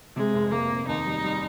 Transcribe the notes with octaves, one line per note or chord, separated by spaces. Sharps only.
C3 G#3
F1
C3 A#3
F1
D#2 D#4
G3
G3